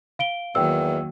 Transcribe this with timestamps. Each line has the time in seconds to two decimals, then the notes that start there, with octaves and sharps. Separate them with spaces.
0.19 F5 D7 G7
0.55 E2 D#3 F#3 A#3 G5 E6